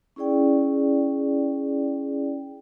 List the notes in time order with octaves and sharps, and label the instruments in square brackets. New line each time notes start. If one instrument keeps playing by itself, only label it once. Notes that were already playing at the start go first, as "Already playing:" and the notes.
[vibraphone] C#4 E4 G#4 D5 G5